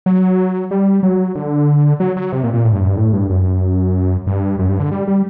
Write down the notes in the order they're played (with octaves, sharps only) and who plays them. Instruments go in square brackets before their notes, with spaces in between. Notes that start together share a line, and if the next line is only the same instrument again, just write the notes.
[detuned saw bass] F#3
G3
F#3
D3
F#3
F#3
C3
A#2
A#2
A2
G2
F#2
G2
A2
G2
F#2
G2
F#2
G2
D3
G3
G3